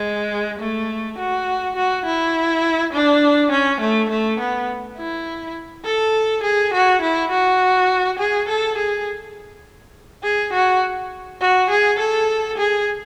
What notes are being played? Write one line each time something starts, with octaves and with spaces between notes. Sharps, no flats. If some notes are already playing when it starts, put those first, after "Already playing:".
Already playing: G#3
A3
F#4
F#4
E4
D4
C#4
A3
A3
B3
E4
A4
G#4
F#4
E4
F#4
G#4
A4
G#4
G#4
F#4
F#4
G#4
A4
G#4